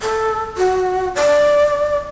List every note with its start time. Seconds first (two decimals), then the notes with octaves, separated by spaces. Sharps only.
0.01 A4
0.57 F#4
1.15 D5